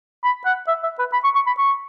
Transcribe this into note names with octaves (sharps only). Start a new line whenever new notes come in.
B5
F#5
E5
E5
B4
B5
C#6
C#6
B5
C#6